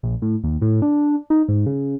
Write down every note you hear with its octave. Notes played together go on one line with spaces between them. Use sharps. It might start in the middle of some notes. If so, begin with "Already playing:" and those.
A#1
A2
D#2
A2
D4
D#4
G#2
C#3